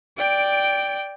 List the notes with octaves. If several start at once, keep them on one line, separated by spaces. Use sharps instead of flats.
D5 G5